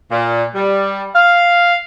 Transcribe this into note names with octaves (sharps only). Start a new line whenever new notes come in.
A#2
G3
F5